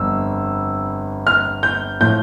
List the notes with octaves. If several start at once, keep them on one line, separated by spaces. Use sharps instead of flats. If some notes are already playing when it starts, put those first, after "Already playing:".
Already playing: G1 F2 E6
F6
G6
A2 F3 G6